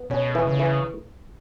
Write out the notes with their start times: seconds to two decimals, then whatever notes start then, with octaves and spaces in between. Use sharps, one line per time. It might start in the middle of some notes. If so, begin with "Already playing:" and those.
Already playing: B3
0.10 B2 C#4
0.35 E3
0.47 C#3
0.59 E3